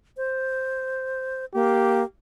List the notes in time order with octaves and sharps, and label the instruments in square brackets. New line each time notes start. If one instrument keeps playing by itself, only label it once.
[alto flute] C5
[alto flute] A#3 [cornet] G4